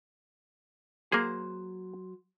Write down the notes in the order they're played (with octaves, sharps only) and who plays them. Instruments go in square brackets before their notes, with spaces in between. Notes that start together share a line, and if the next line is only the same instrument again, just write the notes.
[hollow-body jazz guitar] F#3 C5 [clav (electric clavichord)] A#3 G#4